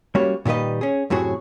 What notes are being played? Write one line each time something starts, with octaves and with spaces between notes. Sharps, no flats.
G3 A#3 C#4 F#4 C#5
A#2 D#3 G3 B4 D#5
C#4 G#4
F#2 A2 C3 F#4 G#4